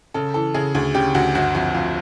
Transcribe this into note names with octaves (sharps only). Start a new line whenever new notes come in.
C#3 A4
E3 A4
C#3 G#4
D2 G#4
C#3 G4
D2 F#4
G1 F#4
F2 F#4
F2 F4